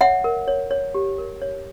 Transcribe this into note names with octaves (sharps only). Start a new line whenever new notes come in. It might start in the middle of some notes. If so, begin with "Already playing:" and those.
C#5 E5 F#5
A#4
C#5
C#5
G4
A#4
C#5